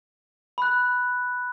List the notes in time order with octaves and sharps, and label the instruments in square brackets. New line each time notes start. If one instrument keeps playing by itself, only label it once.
[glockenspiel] B5 F#6